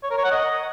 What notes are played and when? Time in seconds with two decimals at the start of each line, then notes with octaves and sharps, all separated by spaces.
0.03 C#5
0.10 A#4
0.17 C#5
0.24 F#5
0.31 D#5